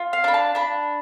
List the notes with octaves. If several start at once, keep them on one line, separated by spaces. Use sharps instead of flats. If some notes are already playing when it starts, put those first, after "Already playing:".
Already playing: F4
F5
D4 B5
A5
D4 B5